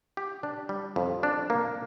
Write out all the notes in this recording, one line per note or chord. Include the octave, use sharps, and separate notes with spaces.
G4
D4
G3
F2
D4
A#3